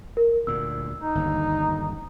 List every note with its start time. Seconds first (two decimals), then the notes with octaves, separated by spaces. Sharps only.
0.17 A#4
0.47 D2 A#2 E6
1.01 D#4
1.15 G1 D#2 D3